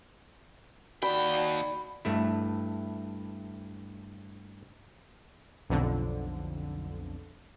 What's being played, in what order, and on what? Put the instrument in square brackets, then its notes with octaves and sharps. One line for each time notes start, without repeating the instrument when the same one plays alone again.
[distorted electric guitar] D#2 G5 [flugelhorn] F#4 [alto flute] D5 [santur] B5
[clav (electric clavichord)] G2 A3 E4
[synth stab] B1 F2 D3